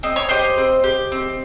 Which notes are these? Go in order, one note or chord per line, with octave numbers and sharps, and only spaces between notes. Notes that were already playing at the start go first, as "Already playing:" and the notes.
C4 D#5
C#5
G4 C5 D#5
C4
G4
C4